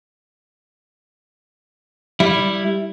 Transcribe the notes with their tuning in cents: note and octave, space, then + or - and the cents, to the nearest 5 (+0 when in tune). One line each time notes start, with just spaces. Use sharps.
G3 +0 E4 +0